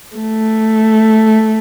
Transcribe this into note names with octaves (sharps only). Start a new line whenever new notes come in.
A3